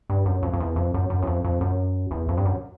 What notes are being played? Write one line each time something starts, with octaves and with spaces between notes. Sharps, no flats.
G2
F#2
F2
F2
E2
F2
F#2
F#2
E2
F2
F2
F#2
E2
F2
G2
F#2